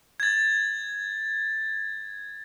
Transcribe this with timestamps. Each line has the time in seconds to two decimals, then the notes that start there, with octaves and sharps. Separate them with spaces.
0.20 G#6 A6